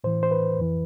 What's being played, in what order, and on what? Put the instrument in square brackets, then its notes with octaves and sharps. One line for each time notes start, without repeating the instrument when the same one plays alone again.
[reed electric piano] A2 E3 C5
C5
B4
F2 E3